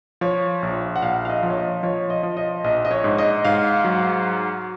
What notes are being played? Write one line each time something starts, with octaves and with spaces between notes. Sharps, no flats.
F3 C#5
A#1
F#5
A#1 F5
F5
D#5
F3
C#5
D#5
F3 C#5
D#5
F3
D#5
A#1 D#5
D#5
C#5
G#2
D#5
G#2 F5
F#3